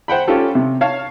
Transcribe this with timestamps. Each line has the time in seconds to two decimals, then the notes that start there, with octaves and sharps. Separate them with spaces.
0.08 C5 F#5 G5 B5
0.28 C#4 F4 G4 A4
0.55 C3
0.81 C#5 F5 A5